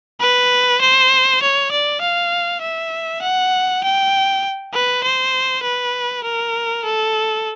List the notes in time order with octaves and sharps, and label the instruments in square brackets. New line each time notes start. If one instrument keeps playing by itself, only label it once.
[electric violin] B4
C5
C#5
D5
F5
E5
F#5
G5
B4
C5
B4
A#4
A4